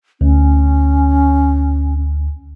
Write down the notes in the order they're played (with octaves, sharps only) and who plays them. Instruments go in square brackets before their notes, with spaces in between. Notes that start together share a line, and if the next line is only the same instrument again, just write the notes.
[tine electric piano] D2 [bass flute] C#4